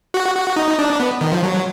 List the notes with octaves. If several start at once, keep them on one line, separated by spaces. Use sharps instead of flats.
F#4
F#4
D#4
D4
B3
D#3
F3
F#3